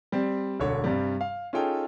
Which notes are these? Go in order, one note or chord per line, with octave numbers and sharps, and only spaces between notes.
G3 C4
E1 D3 C#5
G2 C3 G3
F5
C#4 D#4 F4 G#4 A4 G5